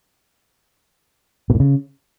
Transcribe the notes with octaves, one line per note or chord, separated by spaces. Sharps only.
B2
A2
C#3